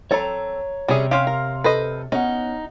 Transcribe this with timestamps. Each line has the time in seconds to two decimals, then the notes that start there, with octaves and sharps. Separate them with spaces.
0.11 C4 A4 C#5 A#5
0.88 C3 G3 C#4 G#4
1.11 C#4 G4 F5 C6 F6
1.27 A#4
1.64 A4 B4 C5 D#5
2.12 B3 C#4 D#4 F#5